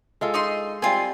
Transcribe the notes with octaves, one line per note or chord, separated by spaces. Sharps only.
G#3 F4 A4
D#4 D#5 C6
G3 C4 F4 G#5